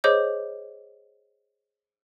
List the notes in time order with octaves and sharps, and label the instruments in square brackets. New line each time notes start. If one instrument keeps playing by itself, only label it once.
[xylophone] G#4 C5 C#5 D#5 D6 G6